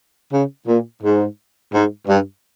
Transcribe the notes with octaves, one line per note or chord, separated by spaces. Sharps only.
C#3
A#2
G#2
G#2
G2